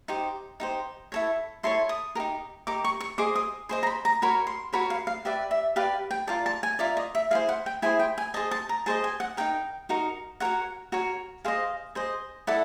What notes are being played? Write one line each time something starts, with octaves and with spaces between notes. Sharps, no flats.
D#4 G4 C5
D#4 G4 C5
E4 A4 C#5
E4 A4 C#5 C6
D#6
D#4 G4 A#4
D#4 G4 A#4 D6
C#6
C#6
G#4 C5 D#5 D6
D#6
G#4 C5 D#5 C6
A#5
B5
A#5
F#4 A#4 C#5 B5
C6
F#4 A#4 C#5 B5
F5
F5
G4 B4 D5 E5
E5
G4 B4 D5 F5
G5
F4 A#4 D5 A5
A5
G#5
F4 A#4 D5 E5
D#5
E5
E4 G#4 C5 F5
F#5
G5
E4 G#4 C5 G#5
G5
G#5
G#4 C5 D#5 A5
A5
A#5
G#4 C5 D#5 A5
G#5
F#5
D#4 F#4 A#4 G5
D#4 F#4 A#4
F#4 A#4 C#5 F#5
F#4 A#4 C#5
G#4 C5 D#5 F5
G#4 C5 D#5
E4 A4 D5 F#5